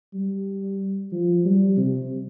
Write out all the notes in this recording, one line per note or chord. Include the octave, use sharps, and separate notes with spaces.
G3
F3
G3
C3